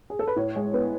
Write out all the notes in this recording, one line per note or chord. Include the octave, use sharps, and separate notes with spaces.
G#4
A4
B4
A2 C#5
G#3
B3